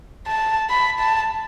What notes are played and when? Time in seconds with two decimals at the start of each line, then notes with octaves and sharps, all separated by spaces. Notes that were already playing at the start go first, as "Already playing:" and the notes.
0.27 A5
0.70 B5
1.00 A5